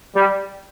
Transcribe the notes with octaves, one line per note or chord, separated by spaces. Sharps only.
G3